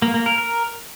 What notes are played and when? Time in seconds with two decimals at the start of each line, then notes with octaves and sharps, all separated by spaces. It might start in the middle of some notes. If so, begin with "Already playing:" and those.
0.02 A#3
0.14 A#3
0.26 A#4
0.38 A#4